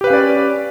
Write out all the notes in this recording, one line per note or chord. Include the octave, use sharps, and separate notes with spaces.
C#4 G4 B4 D5 F5